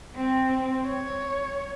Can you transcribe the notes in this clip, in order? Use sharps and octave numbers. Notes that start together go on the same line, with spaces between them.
C4
C#5